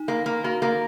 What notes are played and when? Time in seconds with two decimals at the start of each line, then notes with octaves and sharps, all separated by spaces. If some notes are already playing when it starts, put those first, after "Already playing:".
Already playing: D#4
0.08 A#3
0.26 A#3
0.44 A#3 F#4
0.62 A#3